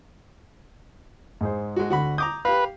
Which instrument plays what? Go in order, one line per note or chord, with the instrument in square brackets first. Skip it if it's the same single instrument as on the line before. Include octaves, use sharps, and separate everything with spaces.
[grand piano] G#2 G#4 C5
[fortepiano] G#3 F#4
[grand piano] D2 D3 [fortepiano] F#4 F#5 B5
[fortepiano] A#5 D6 D#6 [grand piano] G6
[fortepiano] G4 F5 [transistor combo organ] B4